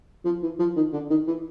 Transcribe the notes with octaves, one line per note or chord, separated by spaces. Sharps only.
F3
E3
F3
D#3
D3
D#3
E3